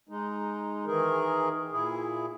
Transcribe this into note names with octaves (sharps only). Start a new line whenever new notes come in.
G#3 D#4
D#3 E3 G#4 A#4
A#2 E4 G#4